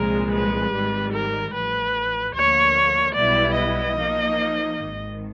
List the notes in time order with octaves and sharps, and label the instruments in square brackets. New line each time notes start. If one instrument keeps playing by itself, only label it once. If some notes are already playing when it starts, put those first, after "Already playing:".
Already playing: [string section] C2 A#2 F3 G#3 [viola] A#4
[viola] B4
[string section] G#1 G#2 D#3 G3
[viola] A#4
[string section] A1 A2 F3 [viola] B4
[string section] D2 D3 F3 A#3 [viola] C#5
[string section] B1 B2 G3 B3 E4 [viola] D5
[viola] D#5
[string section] F3 A#3 D#4
G#1 G#2 D#3